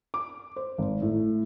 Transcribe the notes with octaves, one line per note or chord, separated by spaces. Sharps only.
D6
C5
G#1
A2